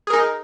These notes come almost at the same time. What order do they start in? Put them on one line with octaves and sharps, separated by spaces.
G#4 A#4 D#4